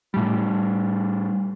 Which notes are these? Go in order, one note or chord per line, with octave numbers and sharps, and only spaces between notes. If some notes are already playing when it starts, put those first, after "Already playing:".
A2 G3